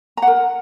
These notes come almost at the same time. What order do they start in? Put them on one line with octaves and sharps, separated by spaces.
A#5 F#5 A#4